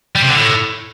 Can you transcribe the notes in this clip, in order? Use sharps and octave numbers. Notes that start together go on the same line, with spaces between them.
G3
C3
D3
A2